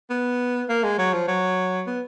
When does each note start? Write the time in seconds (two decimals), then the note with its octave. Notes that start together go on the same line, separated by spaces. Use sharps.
0.10 B3
0.69 A#3
0.84 G#3
0.98 F#3
1.13 F3
1.28 F#3
1.87 B3